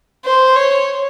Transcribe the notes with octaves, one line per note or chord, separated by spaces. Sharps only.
C5
C#5